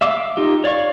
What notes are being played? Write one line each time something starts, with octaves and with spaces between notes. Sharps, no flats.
E5 F5 D6 E6
D#4 F4 G4
C#5 D5 F5 C#6